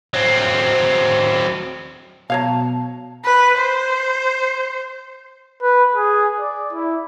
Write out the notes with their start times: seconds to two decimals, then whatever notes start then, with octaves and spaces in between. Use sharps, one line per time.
0.14 F#3 C4
2.30 B2 F#3 C#5 F5 A5
3.25 B4
3.59 C5
5.62 B4
5.95 G#4
6.40 D5
6.73 E4